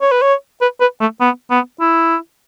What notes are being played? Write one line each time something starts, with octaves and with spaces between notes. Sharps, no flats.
C#5
B4
C#5
B4
B4
A3
B3
B3
E4